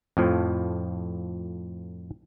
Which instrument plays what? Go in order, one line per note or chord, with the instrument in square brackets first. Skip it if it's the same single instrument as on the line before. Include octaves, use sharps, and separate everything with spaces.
[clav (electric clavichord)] F2 A2 F3